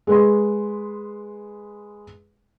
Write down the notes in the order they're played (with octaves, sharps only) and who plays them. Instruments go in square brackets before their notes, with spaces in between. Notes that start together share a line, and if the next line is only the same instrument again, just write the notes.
[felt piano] G#3 B4 C6